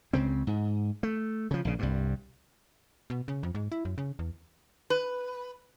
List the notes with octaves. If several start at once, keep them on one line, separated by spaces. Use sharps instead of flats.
C#2 C#3 C4
G#2
A3
C#3 F3
A#1 C#3
C2 G2
B2
C#3
F2
G#2
E4
F#2
C#3
E2
B4